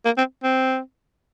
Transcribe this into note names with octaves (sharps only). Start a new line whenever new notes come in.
A#3
C4
C4